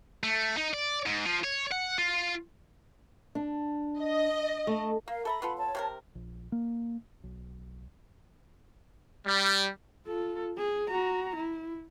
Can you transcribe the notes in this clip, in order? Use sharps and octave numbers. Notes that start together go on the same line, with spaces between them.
A3
D#4
D5
G#2
F3
C#5
F#5
F4
D4
D#5
A3
A#3 A#4 F5
A4 E5 A#5 B5
B3 F4 A4
C#5 A5
C3 C#4 A#4
A#1
A#3
B1
G3
F4 A4
G#4
F#4 A#5
E4